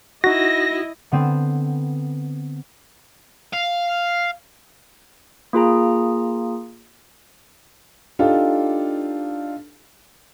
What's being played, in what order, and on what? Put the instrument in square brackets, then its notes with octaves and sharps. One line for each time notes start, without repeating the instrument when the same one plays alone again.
[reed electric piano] D#4 F#4 [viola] E4 D#5 [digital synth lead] A#6
[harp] D3 B3 C4 E7
[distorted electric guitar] F5
[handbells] A#3 F4 G#4 A#5
[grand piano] D4 D#4 F4 G4 A4